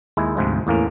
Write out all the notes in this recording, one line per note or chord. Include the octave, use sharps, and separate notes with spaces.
D#2 G#3 E4
D2 G#2 C3 F3 G#3
E2 A2 A#3 C#4